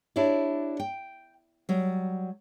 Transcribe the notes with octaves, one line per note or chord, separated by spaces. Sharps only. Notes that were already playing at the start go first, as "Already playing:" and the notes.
D4 E4 G4 C#5 D5
G5
F#3 G3